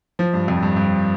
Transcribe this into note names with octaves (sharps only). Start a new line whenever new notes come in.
F3
G2
F2
G2
G2